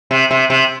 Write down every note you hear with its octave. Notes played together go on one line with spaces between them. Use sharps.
C3
C3
C3